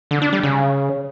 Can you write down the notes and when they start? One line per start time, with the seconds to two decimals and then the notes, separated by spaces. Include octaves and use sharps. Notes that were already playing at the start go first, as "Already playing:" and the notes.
0.11 D3
0.22 D4
0.33 G3
0.43 C#3